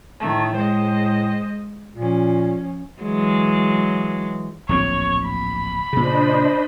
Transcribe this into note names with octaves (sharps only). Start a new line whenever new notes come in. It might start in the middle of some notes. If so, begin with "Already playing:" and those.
A2 D#3 A3
G#3 C5 D#5
A#2 F3 C#4
E3 F#3 G#3
D1 A#1 C4 C#5
B5
A#2 C#3 D4 C5 D#5